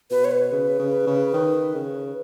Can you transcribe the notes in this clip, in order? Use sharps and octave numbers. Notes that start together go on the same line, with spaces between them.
B2 B4
C#5
B4
C#3
C#3
C#3
D#3
C#3